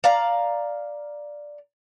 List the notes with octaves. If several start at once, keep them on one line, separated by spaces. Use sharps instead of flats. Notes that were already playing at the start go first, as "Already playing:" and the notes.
D5 F5 A#5